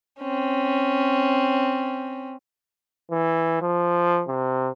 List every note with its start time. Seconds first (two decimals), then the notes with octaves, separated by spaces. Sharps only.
0.21 C4 C#4
3.11 E3
3.62 F3
4.28 C3